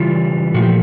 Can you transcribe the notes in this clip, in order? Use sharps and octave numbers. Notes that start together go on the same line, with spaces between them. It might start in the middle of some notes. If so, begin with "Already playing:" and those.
Already playing: C#3 E3 G3 F4
A#2 F3 A3 F#4
G4